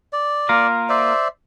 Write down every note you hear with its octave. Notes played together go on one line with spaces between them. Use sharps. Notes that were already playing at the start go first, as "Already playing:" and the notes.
D5
A#3 F4 A#4
C5 D5 E5